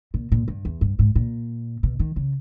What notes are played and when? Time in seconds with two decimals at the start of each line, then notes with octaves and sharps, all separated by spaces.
0.14 A#2
0.32 A#2
0.48 G2
0.65 E2
0.81 G2
0.99 G#2
1.16 A#2
1.83 B2
1.99 D#3
2.16 C#3